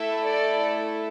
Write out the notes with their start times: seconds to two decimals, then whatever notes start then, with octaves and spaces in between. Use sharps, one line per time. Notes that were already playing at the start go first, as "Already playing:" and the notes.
Already playing: A3 E4 A4 E5
0.25 D5